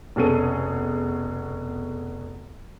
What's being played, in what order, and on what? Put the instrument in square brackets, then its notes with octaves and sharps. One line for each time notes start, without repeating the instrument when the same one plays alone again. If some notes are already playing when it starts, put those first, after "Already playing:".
[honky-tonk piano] F1 B2 C#4 G#4 A4 D#7